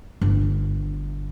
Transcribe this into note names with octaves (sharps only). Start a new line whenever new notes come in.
G1